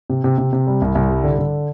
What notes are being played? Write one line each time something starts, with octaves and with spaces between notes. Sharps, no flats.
C3
C3
C3
C3
G3
C2
C2
G3
D3
D3